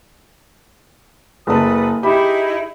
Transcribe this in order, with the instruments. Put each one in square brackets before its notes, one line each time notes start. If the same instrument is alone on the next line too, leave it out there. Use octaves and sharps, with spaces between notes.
[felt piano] F#1 A5 [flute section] A4 B4 D#6
[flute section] D#4 E4 G#4 [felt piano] G4 B5